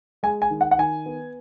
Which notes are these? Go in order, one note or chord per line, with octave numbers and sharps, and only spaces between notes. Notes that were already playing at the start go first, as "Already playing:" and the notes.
G#3 G#5
G#5
D#3
F#5
F#5
D#3 G#5
B3